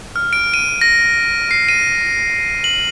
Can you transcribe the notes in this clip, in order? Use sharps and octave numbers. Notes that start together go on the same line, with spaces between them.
F6
D7
D#7
A#6
C7
D#7
F#7